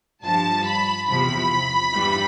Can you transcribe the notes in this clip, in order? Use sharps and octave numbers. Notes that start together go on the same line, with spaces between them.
G2 F3 A5
B5
E2 C3 F3 B5
G2 E3 G3